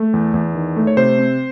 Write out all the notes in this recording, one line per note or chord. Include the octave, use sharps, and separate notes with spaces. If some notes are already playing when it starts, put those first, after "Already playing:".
Already playing: A3
E2
E2
D#3
A3
C#5
C3 C5
C4